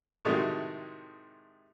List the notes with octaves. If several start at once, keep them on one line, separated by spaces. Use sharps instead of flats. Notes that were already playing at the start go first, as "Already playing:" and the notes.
A2 C3 D#3 F#3 G#3 A3